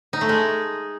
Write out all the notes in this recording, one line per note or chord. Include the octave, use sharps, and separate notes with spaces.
D#4
A3
G#3